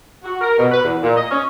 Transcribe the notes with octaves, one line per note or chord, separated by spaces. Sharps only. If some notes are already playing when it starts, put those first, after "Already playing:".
F#4
A#4
B2
B4
E2
A#2
D#5
C#4